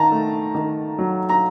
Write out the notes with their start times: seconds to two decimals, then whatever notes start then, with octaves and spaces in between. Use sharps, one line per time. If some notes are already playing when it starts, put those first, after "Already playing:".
Already playing: D#3 A5 A#5
0.11 A3
0.55 D#3
0.99 F#3
1.29 A#5